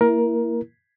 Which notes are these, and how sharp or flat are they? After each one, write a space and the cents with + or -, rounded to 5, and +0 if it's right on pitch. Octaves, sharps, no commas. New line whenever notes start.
A#3 -10 E4 +5 A#4 +15